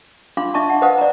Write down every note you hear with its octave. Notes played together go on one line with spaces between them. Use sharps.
D4 F4 F5 C6 D6
D4 D#5 E5 A5 C#6
F#5
B4 C5 D#5 F5 F#5 D#6
D5 A#5